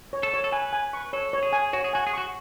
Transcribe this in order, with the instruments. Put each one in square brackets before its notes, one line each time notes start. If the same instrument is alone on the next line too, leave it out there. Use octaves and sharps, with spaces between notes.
[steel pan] C#5
[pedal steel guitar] A4
[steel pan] C#5
[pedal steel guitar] A4
[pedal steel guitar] B4 [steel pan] G#5
[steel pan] G#5
C#6
[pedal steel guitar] A4 [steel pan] C#5
[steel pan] C#5
[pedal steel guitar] G#4
[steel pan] G#5
[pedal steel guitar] F#4 [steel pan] C#5
[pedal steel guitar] G#4
[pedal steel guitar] F#4 [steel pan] G#5
[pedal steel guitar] G#4
[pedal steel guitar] F#4 [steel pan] C#6